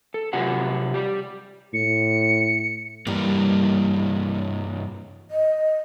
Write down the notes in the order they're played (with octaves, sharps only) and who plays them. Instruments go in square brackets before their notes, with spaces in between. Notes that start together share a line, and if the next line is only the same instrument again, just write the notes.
[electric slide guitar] A4
C3 F#3 F4 G4 F#5 G#5
G4 D5
[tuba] A2 [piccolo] C#7
[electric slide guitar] G2 E3 A#3 [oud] G3
[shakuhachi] D#5